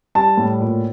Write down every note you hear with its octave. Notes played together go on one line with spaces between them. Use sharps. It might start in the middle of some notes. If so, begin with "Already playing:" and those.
G3 A5
A2
A#2